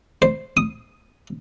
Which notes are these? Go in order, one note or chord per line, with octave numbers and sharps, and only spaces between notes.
C5
D#6